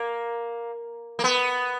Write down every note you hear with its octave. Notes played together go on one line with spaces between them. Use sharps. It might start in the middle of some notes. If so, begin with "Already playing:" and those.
Already playing: A#3
A#3
B3